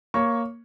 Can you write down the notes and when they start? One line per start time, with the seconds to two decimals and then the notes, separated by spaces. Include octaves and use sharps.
0.14 A#3 C#5 C#6